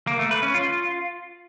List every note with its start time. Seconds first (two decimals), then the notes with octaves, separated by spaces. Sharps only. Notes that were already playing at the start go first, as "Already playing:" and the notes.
0.07 A#3
0.19 A3
0.31 B4
0.43 C#4
0.54 F4